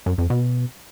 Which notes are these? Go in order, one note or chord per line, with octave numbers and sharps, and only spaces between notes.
F#2
F2
B2